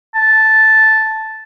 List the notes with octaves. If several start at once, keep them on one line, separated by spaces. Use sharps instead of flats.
A5